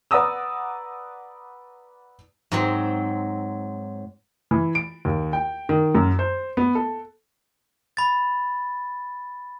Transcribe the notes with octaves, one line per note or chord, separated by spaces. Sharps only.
B4 D5 F#5 A#5 D#6 E6
G#2 F#3 C4
E3
D7
D#2
G5
D#3
F#2
C5
B3
A4
B5 A6